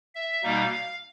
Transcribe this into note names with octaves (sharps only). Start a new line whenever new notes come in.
E5
B2 G3 A#3 D#4 F5